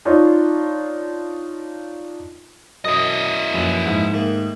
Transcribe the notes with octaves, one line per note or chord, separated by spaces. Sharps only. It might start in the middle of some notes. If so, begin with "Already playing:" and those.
D4 D#4 F4 C#5
F#2 E4 D#5 D#6
A#1 F#2 B4 A#5
G#2
D#3 A3 A#3